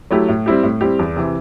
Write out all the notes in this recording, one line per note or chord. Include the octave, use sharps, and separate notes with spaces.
F#3 A3 E4 G4
A2
G3 C4 E4 G4
A2
G3 C4 E4 G4
E2
C3 E3